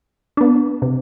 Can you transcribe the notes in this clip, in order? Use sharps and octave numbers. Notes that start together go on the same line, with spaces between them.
B3 D4
C3